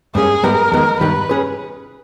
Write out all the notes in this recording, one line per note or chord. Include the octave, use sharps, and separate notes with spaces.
G2 G3 A#3 C#4 G#4
G#2 G3 B3 G4 A#4 B4
E2 D#3 G#3 B3
G2 D#3 G3 B4
C#4 G#4 B4